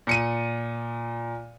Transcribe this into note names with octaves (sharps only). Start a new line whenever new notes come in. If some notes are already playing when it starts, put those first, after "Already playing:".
A#2 C#7 D#7